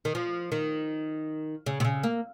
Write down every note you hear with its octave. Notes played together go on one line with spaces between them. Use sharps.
D#3
F3
D#3
C#3
C3
C#3
A#3